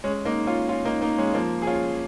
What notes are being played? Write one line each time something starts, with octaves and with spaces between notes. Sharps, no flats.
G#3 C#4
A#3 D#4
C#4 F4
C#4 F4
A#3 D#4
A#3 D#4
G#3 C#4
F3 A#3
G#4
C#4 F4